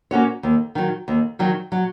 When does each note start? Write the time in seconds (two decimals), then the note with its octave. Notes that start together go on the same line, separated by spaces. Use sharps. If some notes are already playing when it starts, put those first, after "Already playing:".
0.11 A#3 C#4 F#4 C#5
0.43 D#2
0.75 D#3 F#3
1.08 D#2
1.39 D#3 F#3
1.72 F#3